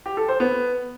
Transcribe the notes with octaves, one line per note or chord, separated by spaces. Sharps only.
G4
A4
C5
B3